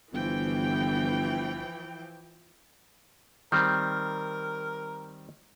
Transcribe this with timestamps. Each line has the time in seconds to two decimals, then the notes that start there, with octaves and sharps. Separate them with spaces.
0.13 G1 E3 F3 G5
3.52 D#3 G3 C4 A#4 F6 G6